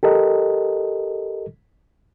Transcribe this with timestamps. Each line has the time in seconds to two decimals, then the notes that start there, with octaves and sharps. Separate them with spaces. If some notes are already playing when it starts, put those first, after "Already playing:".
0.03 G4 A4 A#4 D#5